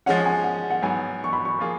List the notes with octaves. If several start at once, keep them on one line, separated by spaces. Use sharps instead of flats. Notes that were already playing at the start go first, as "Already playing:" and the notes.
F3 G#3 C#4 F#5
G#5
F#5
F#5
G#2 F#3 B3 G#5
C#6
B5
C#6
F3 A#3 F4 G#4